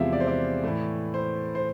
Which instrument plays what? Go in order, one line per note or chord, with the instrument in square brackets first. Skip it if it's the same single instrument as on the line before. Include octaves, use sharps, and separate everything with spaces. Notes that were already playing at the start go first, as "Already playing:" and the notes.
Already playing: [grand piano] E2 C3 F3 G#3 E5 F5
D5
C5
D5
A2 E3 A3
C5
C5